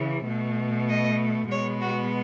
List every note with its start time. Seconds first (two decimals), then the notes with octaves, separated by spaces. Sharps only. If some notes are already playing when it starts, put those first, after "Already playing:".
Already playing: C#3 E3
0.26 B2 A3
0.89 D#5
1.50 B2 G#3 B3 C#5
1.81 F#4